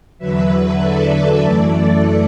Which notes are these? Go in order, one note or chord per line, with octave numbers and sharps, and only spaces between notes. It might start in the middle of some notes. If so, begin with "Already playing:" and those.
E2 D3 F#3 B4 E5
A4 D5
F#2 E3 A3